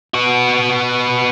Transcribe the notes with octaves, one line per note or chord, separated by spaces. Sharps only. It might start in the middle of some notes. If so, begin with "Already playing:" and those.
B3 F#4